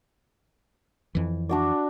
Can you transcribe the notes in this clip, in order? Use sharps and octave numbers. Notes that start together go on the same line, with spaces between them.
F2 E3
D4 F#4 D5